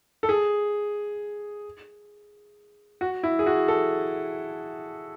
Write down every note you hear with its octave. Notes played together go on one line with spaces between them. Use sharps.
A4
G#4
F#4
E4
G#4
F#4
A4